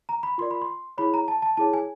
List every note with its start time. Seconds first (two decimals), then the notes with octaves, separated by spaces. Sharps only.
0.09 A#5
0.23 B5
0.38 F4 A#4 D5 C6
0.51 B5
0.61 C6
0.98 E4 G#4 C#5 B5
1.14 A#5
1.28 A5
1.42 A5
1.57 E4 G#4 C#5 A5
1.73 G#5